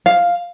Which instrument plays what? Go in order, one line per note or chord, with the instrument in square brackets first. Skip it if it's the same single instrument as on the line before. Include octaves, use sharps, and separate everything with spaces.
[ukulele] F5